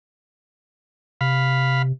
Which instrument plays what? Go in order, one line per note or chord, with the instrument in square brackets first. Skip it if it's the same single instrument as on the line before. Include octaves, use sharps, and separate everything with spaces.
[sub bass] C3 [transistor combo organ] F5 B5